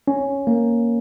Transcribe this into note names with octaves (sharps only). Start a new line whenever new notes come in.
C#4
A#3